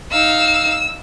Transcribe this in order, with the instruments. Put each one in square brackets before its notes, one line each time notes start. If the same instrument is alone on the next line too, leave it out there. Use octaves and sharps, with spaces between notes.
[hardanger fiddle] D#4 F5 [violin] E6